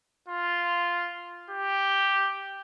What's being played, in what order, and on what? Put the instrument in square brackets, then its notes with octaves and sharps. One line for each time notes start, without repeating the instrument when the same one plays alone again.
[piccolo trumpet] F4
G4